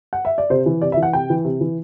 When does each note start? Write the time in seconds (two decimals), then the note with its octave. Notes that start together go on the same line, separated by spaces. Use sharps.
0.13 F#5
0.25 E5
0.38 D5
0.50 C3 C5
0.66 E3
0.82 C3 D5
0.92 E5
0.97 E3
1.03 F#5
1.13 C3 G5
1.30 E3
1.45 C3
1.61 E3